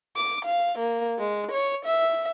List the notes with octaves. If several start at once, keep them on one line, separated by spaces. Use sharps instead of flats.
D6
F5
A#3
G#3
C#5
E5